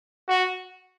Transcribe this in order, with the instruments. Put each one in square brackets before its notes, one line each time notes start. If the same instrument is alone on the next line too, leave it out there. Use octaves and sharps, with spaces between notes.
[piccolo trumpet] F#4